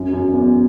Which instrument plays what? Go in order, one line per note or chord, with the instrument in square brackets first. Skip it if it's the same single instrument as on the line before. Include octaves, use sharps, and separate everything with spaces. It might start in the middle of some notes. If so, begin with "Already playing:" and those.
Already playing: [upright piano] F#2
F#2
E2